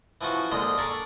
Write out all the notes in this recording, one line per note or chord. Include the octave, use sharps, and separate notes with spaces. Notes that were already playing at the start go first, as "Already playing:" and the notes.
E3 F3 C#4 F#4
D#2 G#2 D3 G#3 D#5
D4 A4 A#4 C#5 D5 G#5